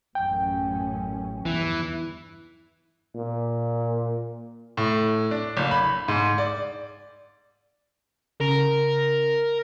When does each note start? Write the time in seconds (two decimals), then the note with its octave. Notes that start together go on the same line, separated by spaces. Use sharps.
0.15 A1 F#2 C#4 G5
1.46 E2 G2 E3
3.15 A#2
4.77 A2
5.31 D4
5.57 F#1
5.71 B5
6.08 G#2
6.38 D5
8.41 C#3 A#4